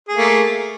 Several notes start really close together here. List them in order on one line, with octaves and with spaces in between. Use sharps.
G#4 A3 A#3